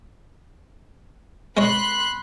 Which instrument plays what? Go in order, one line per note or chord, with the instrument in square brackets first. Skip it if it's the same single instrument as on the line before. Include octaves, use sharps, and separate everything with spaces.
[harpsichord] G#3 C#5 [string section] B5 C6 F#6